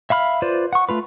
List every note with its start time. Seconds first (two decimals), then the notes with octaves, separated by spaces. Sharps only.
0.10 E5 F5 B5 F6
0.42 F4 B4 C5 D5
0.73 F#5 C#6
0.89 A3 F4 B4